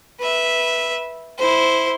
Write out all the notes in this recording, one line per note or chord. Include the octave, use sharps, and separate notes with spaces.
B4 E5
E4 C5